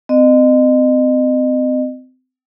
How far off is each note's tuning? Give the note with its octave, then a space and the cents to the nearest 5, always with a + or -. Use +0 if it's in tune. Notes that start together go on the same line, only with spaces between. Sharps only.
C4 -30 D#5 -30